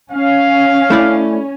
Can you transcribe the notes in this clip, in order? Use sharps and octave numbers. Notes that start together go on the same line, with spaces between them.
C#4 F5
A3 E4 D5